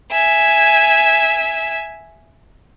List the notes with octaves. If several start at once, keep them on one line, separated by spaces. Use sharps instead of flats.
E5 G#5